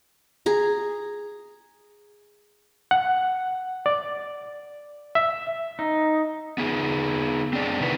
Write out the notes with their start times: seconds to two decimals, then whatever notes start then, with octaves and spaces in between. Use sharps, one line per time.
0.46 G#4 A#5
2.91 F#5
3.86 D5
5.15 E5
5.79 D#4
6.58 B3 D#4 G#4
7.53 C4 D4 G#4 D5
7.80 C3 D#3 B3 E4 B4